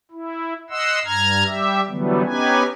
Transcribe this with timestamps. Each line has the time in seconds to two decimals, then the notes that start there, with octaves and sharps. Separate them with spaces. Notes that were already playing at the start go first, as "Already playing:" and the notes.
0.11 E4
0.70 D#5 F#5 C6 E6
1.05 G2 A#5 F6 G#6
1.46 G3 G4 E5
1.88 D3 E3 F#3 G3 A3 B3
2.25 B3 C#4 D#4 G4 B4 G#5